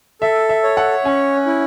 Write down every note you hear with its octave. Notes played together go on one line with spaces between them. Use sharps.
A4 E5
E5
C#5
F#5
C#4 G#5
E4